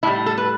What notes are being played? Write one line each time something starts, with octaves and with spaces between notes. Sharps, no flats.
A2 G3 E4
A4
B4